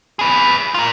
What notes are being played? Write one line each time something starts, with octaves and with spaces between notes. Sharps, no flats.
G#4 B4
F4 A#4